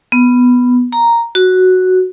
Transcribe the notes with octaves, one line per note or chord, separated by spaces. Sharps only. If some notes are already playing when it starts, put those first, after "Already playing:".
B3
A#5
F#4